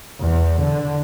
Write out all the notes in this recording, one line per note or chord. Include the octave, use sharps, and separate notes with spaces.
E2
D3